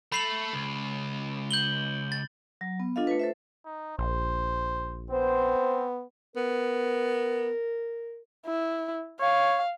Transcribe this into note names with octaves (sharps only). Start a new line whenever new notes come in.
A3 B5 C7 F#7
C#2
G6 F#7 G7
A6
F#3
B3
D4 F4 A4 D#5 F5
A3 F4 B4
A4 C5 E5
D#4
A#1 C5
B3 C4 C5
B3 A#4
E4
C#5 F5